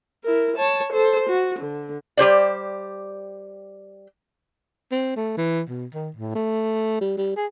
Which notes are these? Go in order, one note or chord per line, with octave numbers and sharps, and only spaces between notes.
E4 A#4
C#5 A5
A4 C5
F#4
D3
G3 G4 C5 D5
C4
A3
E3
B2
D#3
A2
A3
G3
G3
G#4